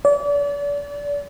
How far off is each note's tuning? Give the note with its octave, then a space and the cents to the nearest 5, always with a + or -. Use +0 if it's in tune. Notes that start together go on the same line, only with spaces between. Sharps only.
D5 -35